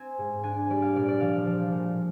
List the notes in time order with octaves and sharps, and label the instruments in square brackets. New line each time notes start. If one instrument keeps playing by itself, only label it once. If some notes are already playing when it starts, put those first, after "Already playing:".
Already playing: [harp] C4 G#5
G#2
D4 G#5
G3 D5
F5
A#2 D5
D5
F3 F5
F3
A#2